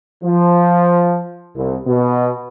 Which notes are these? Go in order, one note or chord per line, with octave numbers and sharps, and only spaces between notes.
F3
C2
B2